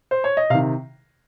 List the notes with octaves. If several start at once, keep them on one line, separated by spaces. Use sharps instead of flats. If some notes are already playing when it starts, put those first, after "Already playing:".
C5
C#5
D#5
C3 D#3 F5